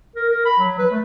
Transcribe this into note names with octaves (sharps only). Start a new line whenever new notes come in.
A#4
A#4
B5
F#3
B4
A3